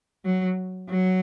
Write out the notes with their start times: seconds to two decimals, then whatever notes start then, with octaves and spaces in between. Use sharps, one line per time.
0.25 F#3
0.90 F#3